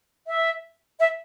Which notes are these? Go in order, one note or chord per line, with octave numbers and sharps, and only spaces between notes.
E5
E5